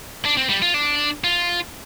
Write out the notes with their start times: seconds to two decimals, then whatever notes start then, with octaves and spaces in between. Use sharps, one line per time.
0.25 D4
0.37 C4
0.49 G3
0.62 F4
0.74 D4
1.24 F4